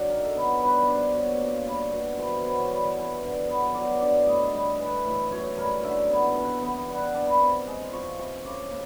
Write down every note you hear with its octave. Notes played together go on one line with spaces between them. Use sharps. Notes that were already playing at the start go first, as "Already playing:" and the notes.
Already playing: F#3 D4
D#3 A#4
A4
B3 A#4
G3 B4
D4 C5
B2 C#5
A#3
G3
B2
E3 C5
B3 C#5
G3
E3
D3
B3
F#3 D5
D3 D5
A2 D#5
G3
E3
A2
F#2 C#5
G3 A#4
D3 E5
B3
E3
B3
G3 F#5
G5
D4 A5
B5
C3
G#3
F3 C#6
C3 C#6
C#3 D6
A#3